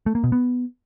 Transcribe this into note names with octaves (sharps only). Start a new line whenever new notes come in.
A3
A#3
B2
B3